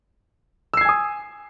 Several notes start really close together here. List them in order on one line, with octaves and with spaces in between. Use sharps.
E6 C7 G#6 G#5 D#6